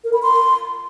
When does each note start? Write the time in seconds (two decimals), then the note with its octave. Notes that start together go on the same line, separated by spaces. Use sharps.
0.04 A#4
0.13 B5
0.22 C6